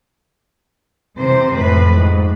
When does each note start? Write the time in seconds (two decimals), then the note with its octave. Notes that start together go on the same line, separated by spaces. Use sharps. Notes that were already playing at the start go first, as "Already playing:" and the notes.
1.17 C3 E3 C5
1.56 F2 A2 B4
1.96 G#2